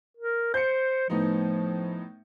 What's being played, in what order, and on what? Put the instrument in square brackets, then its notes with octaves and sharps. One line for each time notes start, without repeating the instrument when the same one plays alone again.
[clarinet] A#4
[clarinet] C5 [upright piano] G6 C#7
[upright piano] A2 B3 D#4 [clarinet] F3